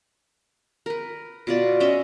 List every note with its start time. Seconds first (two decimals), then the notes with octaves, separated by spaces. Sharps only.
0.86 A#4 B4
1.47 B2 F4 D5
1.80 C#4 D#5 E5